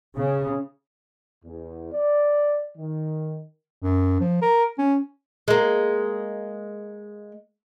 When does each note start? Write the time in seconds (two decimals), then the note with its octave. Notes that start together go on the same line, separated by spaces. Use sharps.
0.16 C#3
1.45 E2
1.93 D5
2.78 D#3
3.82 F#2
4.20 F3
4.42 A#4
4.79 C#4
5.48 G#3 A#3